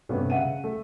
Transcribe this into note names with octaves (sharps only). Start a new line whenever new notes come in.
G2 C3 G3 A3 B3 C#4
C#3 E5 F#5 D#7
A3